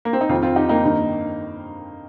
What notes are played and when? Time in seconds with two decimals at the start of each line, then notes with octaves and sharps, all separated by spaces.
0.05 A#3
0.13 C4
0.21 D#4
0.29 F2 D#3 C4 F4
0.43 C4 F4
0.56 D#4 G4
0.69 A#3 D#4
0.83 G2 D#3